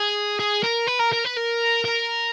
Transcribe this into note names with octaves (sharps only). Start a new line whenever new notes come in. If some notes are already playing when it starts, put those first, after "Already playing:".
Already playing: G#4
G#4
A#4
B4
A#4
A#4
B4
A#4
A#4